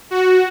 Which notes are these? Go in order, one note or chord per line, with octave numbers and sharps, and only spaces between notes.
F#4